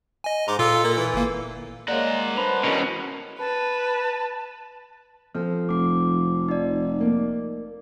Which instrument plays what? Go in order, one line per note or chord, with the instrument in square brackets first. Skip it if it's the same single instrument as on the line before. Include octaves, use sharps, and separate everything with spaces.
[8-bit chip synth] D#5 G#5
[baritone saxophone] G#2 [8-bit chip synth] A#5 C6 D6
[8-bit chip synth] A#2 A4 E6 [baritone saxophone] F4
[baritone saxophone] A#3
E3
[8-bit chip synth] G1 A#3
[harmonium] G#3 A#3 [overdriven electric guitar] A#4 F#5 [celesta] C#5 D5
[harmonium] D4 B4 C5 [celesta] B5 F7
[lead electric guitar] E2 B2 [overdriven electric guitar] C#4 [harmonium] A#4 C#5
[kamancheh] B4 [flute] A5
[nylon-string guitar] F3 C4 [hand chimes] A4 F6
[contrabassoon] F1 [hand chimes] D6 C7
[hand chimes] D#4 D5
[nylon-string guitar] A#3